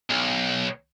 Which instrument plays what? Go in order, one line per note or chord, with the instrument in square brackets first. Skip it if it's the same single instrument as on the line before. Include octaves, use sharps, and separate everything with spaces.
[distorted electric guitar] B1